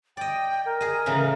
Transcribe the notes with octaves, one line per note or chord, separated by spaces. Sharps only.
D5 D#5 G5
A#4
G#4 D#5
A2 C#3 E3